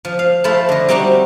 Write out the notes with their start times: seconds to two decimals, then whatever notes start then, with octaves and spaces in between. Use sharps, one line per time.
0.05 F3
0.19 F5
0.44 F3 A3 E4 F4 A4
0.69 D3 D#5
0.89 G3 C4 D#4 F#4 G4